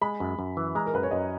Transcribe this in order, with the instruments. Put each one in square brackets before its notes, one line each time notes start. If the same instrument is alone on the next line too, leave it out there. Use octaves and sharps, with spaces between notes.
[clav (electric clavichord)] G#3 [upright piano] B5
[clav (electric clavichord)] F#2
F#2
E3
[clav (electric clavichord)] G#3 [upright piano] A#5
[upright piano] A#4
[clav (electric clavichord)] F#2 [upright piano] B4
[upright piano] C#5
[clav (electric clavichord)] F#2 [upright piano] D#5